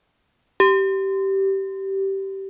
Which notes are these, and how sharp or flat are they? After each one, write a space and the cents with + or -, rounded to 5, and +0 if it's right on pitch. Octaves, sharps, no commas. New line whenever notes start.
G4 -15